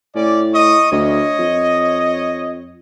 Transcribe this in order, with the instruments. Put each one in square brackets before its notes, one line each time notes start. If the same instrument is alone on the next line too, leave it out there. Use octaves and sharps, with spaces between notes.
[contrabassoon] A2 [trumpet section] C#4 D5
[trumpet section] D#5 C#6 D#6
[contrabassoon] D2 [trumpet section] C#5 D#5
[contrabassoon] F2